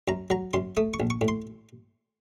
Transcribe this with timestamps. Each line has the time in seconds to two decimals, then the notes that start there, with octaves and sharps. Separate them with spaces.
0.08 F#2 A#5
0.30 F#3 A#5
0.53 F#2 C6
0.77 A3 D#6
0.94 C#6
1.00 A#1
1.10 C#6
1.21 A2
1.28 C6